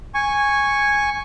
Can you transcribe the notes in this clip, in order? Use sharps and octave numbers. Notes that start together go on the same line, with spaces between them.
G#5 C#6